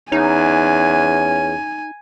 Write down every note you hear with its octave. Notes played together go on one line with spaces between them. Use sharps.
E2 C#4 D#4 G#5